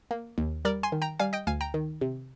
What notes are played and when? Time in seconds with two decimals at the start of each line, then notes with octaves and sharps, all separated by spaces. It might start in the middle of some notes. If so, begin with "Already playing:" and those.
0.11 A#3
0.38 D#2
0.65 G3 A#4 D5
0.83 G#5 C6
0.92 D#3
1.02 G5 A#5
1.19 G3 F5 G#5
1.33 D#5 G5
1.47 D2 F5 G#5
1.61 G5 A#5
1.74 D#3
2.01 C3